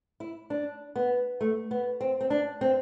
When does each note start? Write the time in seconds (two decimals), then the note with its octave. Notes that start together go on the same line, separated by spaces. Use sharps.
0.20 E4
0.50 D4
0.96 B3
1.41 A3
1.71 B3
2.01 C4
2.21 C4
2.30 D4
2.61 C4